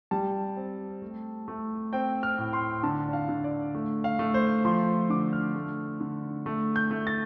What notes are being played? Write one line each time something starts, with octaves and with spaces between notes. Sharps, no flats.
G3 A5
C4
A3
A3
C4 G5
F6
A2
C6
D3 A5
D5
F5
D3
D5
A3
F5
A3
C5
F3 C6
D3 D6
F6
A3
D3
A3
G6
A3
A6